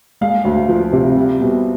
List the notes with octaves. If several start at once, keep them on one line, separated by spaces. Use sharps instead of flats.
G#3 F5
D2
F3
C3
G3
B2